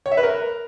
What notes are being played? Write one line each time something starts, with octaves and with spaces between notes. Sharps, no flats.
C#5
E5
B4
A#4